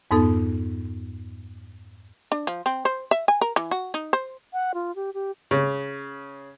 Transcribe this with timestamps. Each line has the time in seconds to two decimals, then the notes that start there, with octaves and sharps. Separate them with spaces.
0.11 F2 G#2 B3 D#4 A4
2.32 D4
2.47 F3
2.66 C4
2.85 C5
3.11 E5
3.28 G#5
3.41 A#4
3.56 E3
3.71 F#4
3.94 D#4
4.13 C5
4.53 F#5
4.74 F4
4.96 G4
5.14 G4
5.51 C#3